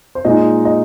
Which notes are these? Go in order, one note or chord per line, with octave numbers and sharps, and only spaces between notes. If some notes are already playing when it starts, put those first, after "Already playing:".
C5
A#2 G#3 D#4 D#5
D#5